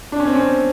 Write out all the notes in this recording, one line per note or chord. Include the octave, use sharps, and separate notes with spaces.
D4
C#4
C4
C#4